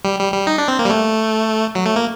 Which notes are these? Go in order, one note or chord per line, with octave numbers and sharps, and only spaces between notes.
G3
G3
G3
D#4
D4
C4
A#3
G3
A3
F#3
A3
A#3